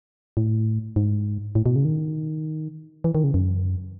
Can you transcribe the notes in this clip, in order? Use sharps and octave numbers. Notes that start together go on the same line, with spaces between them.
A2
G#2
A2
B2
C#3
D#3
E3
D#3
C#3
F#2